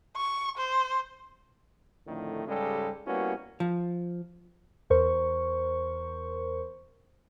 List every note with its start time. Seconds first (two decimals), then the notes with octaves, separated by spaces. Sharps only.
0.16 C#6
0.57 C5
2.07 F2 A2 D3 D#3 A3
2.47 G#2 C#3 G3 G#3 G4 A4
3.06 G3 A#3 B3 C#4 E4 F#4
3.60 F3
4.90 E2 A#4 C5 C#6